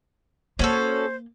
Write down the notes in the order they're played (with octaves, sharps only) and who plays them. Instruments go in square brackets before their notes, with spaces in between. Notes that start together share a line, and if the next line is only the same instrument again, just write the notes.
[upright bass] A#3 [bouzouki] C#4 F#4 A4 [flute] C5